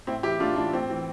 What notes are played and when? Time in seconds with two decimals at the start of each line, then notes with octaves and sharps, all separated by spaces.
0.07 A2 C4 E4
0.23 E3 E4 G4
0.40 A2 D4 F4
0.56 E3 D4
0.73 A2 C4
0.90 E3